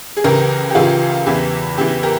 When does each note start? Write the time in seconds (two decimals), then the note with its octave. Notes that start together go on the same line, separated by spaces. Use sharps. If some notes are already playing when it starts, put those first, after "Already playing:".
0.17 G#4
0.24 C#2 C#3 E3 G4 A#4
0.70 G4
0.75 C#2 C#3 E3 F4 G#4
1.26 E2 C#3 E3 E4 G4
1.78 E2 C#3 E3 E4 G4
2.03 G4 A#4